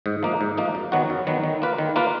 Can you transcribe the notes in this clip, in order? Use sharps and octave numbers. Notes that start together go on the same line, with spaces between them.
G#2
F3 A#3 D#4
G#2
F3 A#3 D#4
F#2
D#3 F#3 B3 F#4
F#2
D#3 F#3 B3 F#4
D#3
A#3 F4 B4
D#3
A#3 F4 B4